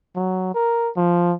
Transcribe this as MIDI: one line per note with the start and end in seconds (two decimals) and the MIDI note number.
0.15 0.50 54
0.54 0.90 70
0.97 1.33 53